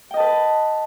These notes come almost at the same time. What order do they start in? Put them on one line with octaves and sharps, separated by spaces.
G5 D#5 A5 B4